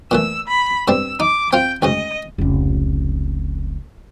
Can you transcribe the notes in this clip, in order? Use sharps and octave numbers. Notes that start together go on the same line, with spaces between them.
A#2 E3 A3 E6
B5
G2 G3 C4 E6
D#4 D6
C4 F4 G5
D2 G#2 C#3 D#5
F1 C#2